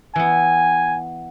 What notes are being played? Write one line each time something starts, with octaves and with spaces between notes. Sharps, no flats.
E3 B3 G#5